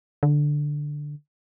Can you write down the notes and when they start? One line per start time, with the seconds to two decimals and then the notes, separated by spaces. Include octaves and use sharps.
0.23 D3